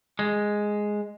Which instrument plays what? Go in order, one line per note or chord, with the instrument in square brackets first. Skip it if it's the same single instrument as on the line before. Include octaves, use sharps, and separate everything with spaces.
[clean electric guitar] G#3